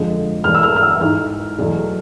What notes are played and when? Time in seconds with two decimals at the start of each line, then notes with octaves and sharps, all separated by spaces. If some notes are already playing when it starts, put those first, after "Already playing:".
Already playing: F2 D3 F3 G#3
0.44 E2 B2 G3 A#3 F6
0.55 E6
0.63 F6
0.76 F6
0.83 E6
1.01 G#2 E3 G#3 F6
1.58 E2 B2 F#3 A3